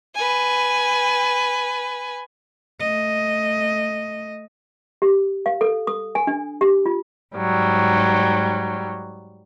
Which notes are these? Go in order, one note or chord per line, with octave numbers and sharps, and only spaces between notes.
B4 G#5
A3 D#5
G4
F5
A4
D#6
G#5
D4
G4
F4
G#2 F#3 G3